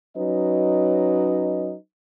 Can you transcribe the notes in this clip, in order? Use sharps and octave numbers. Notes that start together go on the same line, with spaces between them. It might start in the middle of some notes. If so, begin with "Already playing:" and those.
F#3 C#4 D#4 B4 D#5